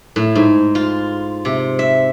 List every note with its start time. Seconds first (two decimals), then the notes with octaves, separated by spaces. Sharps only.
0.16 A2
0.35 G#2
0.75 F4
1.45 C3
1.79 E5